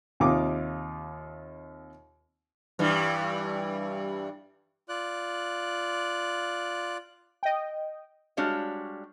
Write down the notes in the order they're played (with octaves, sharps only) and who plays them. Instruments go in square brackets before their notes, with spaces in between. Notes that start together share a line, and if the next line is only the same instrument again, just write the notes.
[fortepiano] D#2 C3 D#4 F4 D6
[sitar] G2 E3 G3
[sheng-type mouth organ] F4 D5 F#6
[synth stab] D#5 G5
[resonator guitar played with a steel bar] G3 G#3 D4 F#4 C#5 F5